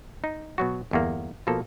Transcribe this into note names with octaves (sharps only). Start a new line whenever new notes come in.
D#4
B2 F#3 F#4
G1 E2 A#3
B2 F3 A#3 A4